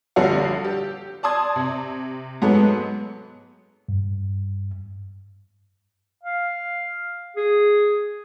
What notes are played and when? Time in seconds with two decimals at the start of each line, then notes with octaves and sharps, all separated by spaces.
0.16 A#1 D3 G3 F#4 C#5 F5
0.64 G4
1.23 D5 A5 C6 D#6 G#6
1.56 C3
2.42 G#2 F#3 G#3 A3 B3
3.89 G2
6.23 F5
7.37 G#4